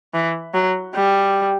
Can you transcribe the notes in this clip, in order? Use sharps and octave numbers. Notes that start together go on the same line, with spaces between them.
E3
F#3
G3